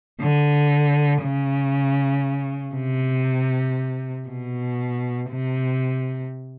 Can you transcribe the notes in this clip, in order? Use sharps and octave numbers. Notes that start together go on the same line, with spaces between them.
D3
C#3
C3
B2
C3